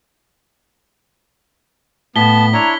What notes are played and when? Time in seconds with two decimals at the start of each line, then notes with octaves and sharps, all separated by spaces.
2.16 A2 B3 A5 B6 G7
2.53 D4 E4 C#5 A#5